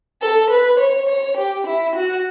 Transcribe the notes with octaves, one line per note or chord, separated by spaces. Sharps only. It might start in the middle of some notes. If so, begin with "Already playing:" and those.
A4
B4
C#5
C#5
G4
E4
F#4